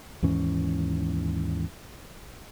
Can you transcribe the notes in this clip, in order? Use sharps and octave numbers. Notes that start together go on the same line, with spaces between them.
D#2 G#2 E3 C#4